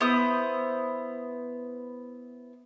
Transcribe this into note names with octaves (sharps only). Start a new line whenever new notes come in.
B3 E4 C5 D#6